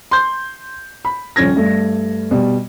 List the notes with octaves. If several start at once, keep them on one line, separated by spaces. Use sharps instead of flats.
C6 G6
B5
D#1 F3 C#4 G#6 A#6
G2 A3
B2 G3